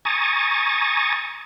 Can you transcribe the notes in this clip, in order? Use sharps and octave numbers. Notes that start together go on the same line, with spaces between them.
G#5 A#5 C#6 D#6 A6